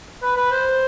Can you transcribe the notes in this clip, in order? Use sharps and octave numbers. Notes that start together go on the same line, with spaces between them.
B4
B4
C5